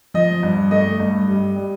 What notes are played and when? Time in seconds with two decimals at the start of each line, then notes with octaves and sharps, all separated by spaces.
0.14 F3 D#5
0.43 G2
0.71 A3 D#5
1.00 G2
1.28 G3
1.56 G3